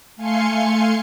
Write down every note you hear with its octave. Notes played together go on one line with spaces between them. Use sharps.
A3 F5 G#5 C6 C#7